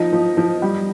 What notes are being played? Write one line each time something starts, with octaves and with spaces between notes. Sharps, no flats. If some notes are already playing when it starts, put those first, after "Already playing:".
Already playing: F3 D#4 D#5
F3
F3
G3